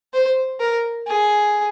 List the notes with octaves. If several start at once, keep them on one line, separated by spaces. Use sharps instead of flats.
C5
A#4
G#4